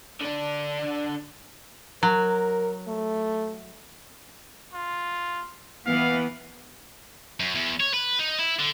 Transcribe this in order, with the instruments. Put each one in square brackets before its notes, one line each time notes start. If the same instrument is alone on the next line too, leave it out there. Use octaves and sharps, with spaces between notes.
[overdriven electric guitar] D3 D4
[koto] F#3 [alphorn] A#4
[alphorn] A3
[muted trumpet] F4
[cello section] E3 B3 [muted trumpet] F5
[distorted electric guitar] F#2
E2
C#5
B4
D#4
E4
D3